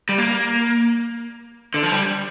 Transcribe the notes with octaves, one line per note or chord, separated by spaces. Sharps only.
G3
A#3
D3
F3
G3